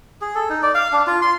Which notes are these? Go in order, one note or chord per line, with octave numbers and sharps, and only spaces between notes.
G#4
A4
D#4
D5
F5
D4
F4
C6